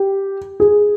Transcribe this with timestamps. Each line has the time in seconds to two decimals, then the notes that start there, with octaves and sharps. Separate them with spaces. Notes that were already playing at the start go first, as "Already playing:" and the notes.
Already playing: G4
0.60 G#4